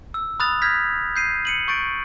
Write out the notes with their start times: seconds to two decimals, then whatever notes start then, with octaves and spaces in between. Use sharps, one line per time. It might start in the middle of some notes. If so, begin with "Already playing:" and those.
0.14 E6
0.40 B5 D#6 F6 F#6 A6 F7
0.62 F6 G6 G#6 A#6 B6
1.16 G6 C7 D#7
1.45 C#7 D#7 F#7
1.68 C#6 G6 A6 D7